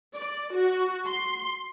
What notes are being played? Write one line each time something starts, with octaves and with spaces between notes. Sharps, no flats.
D5
F#4
C6